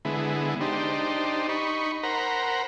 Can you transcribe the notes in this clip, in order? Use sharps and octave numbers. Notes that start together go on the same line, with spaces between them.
D3 G#3 B3 E4
D4 D#4 G4 C5
D#4 B5 C#6
A#4 C5 F#5 A#5 B5